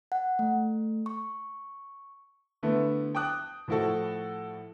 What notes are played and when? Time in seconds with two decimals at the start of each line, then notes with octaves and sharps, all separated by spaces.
0.12 F#5
0.39 A3
1.06 C#6
2.63 D3 A3 B3 E4
3.15 G5 A5 D6 D#6 F#6
3.68 A2 F3 E4 F#4 A4